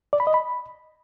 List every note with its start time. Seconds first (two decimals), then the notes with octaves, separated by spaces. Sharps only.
0.13 D5
0.20 B5
0.27 D#5
0.34 B5